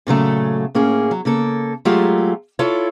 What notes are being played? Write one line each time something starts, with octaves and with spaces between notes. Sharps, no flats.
A#2 C#3 F#3 A3
A2 A#3 C#4 G#4
F#3
C#3 A#3 A4
F#3 G#3 A3 F4 G4
E4 F4 A4 C#5